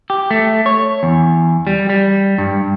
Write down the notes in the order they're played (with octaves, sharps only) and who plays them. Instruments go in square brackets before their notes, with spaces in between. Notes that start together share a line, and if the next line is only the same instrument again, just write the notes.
[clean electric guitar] G4
A3
C#5
E2
G3
G3
G2